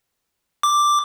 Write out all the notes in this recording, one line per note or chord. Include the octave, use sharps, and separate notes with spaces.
D6